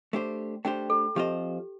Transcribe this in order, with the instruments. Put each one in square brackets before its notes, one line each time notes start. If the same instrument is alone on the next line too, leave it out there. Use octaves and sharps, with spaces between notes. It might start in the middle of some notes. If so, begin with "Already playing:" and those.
[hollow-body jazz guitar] A3 D4 G4 C5
[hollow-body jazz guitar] A3 D4 G4 C5 [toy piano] G5
[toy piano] A4
[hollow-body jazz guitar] F3 C4 F4 C5 D#5 [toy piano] G4